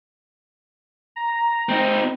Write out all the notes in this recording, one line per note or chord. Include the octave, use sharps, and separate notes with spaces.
A#5
C4 D#4